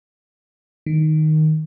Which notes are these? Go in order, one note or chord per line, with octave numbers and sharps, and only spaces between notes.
D#3